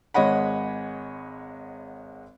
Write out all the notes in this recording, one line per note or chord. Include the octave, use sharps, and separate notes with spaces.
G#1 G#3 C#5 D#5 F#5 B5